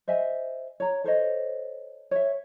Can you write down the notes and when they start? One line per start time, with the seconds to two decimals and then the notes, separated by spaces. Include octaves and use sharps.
0.08 C5 D#5 E5 G#5
0.80 C#5 A#5
1.04 A4 C5 C#5 D#5
2.11 C#5 E5